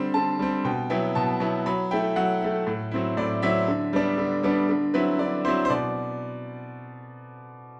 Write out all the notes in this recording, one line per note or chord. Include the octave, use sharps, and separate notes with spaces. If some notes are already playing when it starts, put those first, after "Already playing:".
Already playing: D3 G3 C4 C6
D3 A5
G3 C4
B2 G5
F#3 B3 E4 G5
B2 A5
F#3 B3 E4
F#3 B5
A3 E4 G5
F#3 F#5
A3 E4
A2
F#3 C4 E4
A2 D5
F#3 C4 E4 E5
D3
G3 B3 D4
D3
G3 B3 D4
D3
F#3 C4 E4 B4
D3 D5
F#3 C4 E4 C5
C5
B2 D5